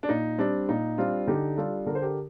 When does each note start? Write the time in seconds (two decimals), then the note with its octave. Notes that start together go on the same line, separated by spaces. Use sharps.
0.03 D4
0.09 A#2 D#4
0.38 G3 C4 D4
0.69 A#2 D#4
0.98 G3 C4 D4 F4
1.27 D3 D#4 G4
1.57 G3 D4 F4 A4
1.86 D3 A#4
1.95 C5
2.02 G4 A#4